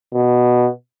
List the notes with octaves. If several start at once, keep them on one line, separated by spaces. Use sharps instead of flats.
B2